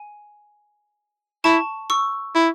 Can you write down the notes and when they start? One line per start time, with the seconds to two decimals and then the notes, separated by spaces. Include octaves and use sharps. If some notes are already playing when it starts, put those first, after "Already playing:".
Already playing: G#5
1.44 E4 A5 C#6
1.90 C#6 E6
2.35 E4